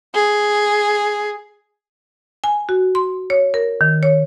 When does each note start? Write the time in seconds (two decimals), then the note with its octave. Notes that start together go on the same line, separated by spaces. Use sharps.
0.14 G#4
2.44 G#5
2.69 F#4
2.95 C6
3.30 C#5
3.54 A#4
3.81 D#3
4.03 C#5